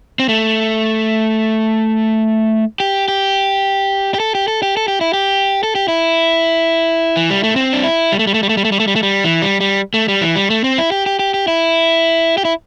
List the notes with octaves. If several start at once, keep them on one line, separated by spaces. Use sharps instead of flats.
C4
A3
G4
G4
G4
A4
G4
A4
G4
A4
G4
E4
G4
A4
G4
E4
E3
G3
A3
C4
D4
E4
G3
A3
G3
A3
G3
A3
G3
A3
G3
A3
G3
A3
G3
E3
G3
G3
A3
G3
E3
G3
A3
C4
E4
G4
G4
G4
G4
E4
G4
E4